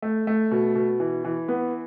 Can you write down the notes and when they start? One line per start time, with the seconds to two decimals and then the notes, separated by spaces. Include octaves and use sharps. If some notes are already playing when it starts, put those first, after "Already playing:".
0.02 A3
0.27 A3
0.51 B2
0.75 B2
1.00 E3
1.25 E3
1.48 B3